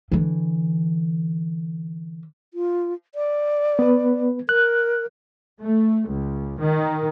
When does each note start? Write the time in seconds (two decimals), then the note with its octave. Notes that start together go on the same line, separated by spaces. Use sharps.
0.12 D3 E3
2.54 F4
3.15 D5
3.79 B3 B4
4.49 A#4 F#6
5.61 A3
6.09 C#2
6.60 D#3